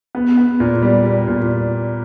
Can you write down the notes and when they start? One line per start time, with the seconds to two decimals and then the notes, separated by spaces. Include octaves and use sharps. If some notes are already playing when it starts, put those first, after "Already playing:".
0.15 B3
0.38 B3
0.60 A#2
0.82 G3
1.05 G3
1.28 A#2